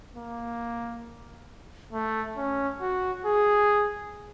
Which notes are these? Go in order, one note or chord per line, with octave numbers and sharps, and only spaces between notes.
A#3
A3
C#4
F#4
G#4